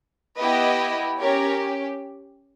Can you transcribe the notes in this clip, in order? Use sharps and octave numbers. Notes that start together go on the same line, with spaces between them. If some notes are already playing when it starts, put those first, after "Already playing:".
B3 E4 G4 B4 D#5
C#4 G4 A#4 C#5